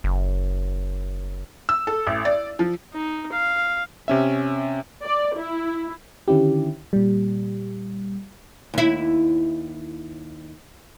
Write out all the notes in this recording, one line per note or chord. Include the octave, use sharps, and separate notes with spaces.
F#1
E6
A4
A1
D5
F3
D#4
F5
C3 C#4 E5
D5
E4
D3 D#3 C#4 E4 G4
A#2 G3
D#2 E4